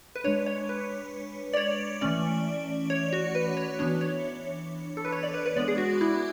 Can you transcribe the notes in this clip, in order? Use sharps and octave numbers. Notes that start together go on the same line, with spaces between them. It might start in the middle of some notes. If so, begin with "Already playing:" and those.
B4
G#3 D4 C#5
C#5
B4
D5
C#5
E3 A3 C#4 D5
C#5
F#4
B4
C#5
E3 B3 D4 C#5
C#5
A4
B4
C#5
D5
B4
B4
G#3 B3 D4 D5
G#4
F#4
E4